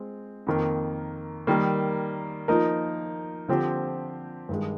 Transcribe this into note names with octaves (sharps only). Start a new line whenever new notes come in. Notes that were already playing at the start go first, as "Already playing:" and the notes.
Already playing: G#3 C4 F4
F2 D#3 A#3
D#3 G3 A#3
F3 A#3 D#4 A#4
D3 F3 C4 G4 C5
G2 D#3 G#3